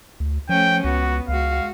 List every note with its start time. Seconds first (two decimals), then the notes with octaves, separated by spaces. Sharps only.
0.20 D2
0.49 F3 A3 C#4 G5
0.84 C#2 B3 F#4
1.28 C#2 G#3 F#4 F5